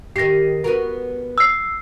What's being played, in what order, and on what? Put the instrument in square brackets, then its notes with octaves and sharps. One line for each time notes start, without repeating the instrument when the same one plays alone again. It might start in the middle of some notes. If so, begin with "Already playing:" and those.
[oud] D#3 G4 [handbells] A#6 C7
[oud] B3 F#4 A#4
[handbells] E6 C7